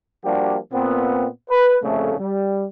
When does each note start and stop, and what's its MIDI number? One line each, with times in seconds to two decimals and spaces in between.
0.25 0.58 53
0.25 0.58 55
0.25 0.58 58
0.25 0.58 62
0.25 0.58 66
0.25 0.58 67
0.73 1.27 46
0.73 1.27 59
0.73 1.27 60
1.51 1.77 71
1.84 2.15 36
1.84 2.15 41
1.84 2.15 46
1.84 2.15 49
1.84 2.15 57
2.20 2.66 55